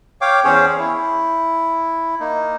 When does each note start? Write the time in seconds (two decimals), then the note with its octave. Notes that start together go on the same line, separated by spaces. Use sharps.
0.21 C#5 F5 G5 D6
0.44 E2 C#4 G#4 C5 C#5
0.79 E4
2.20 A#3 D#4